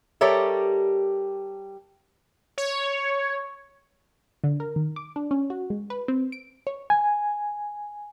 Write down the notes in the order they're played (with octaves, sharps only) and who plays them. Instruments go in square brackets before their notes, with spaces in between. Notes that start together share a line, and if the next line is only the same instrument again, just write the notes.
[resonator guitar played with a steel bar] G3 G4 A4 A#4 C#5 E5
[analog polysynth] C#5
[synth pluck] D3
A#4
D#3
D6
D4
C#4
F#4
G#3
B4
C4
D7
C#5
[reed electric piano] G#5